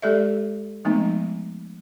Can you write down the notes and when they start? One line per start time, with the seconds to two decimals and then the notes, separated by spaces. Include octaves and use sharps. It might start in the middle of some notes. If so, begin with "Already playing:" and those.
0.02 G#3 G4 A4 D5 E5
0.85 F3 G#3 A3 B3 C4 D#4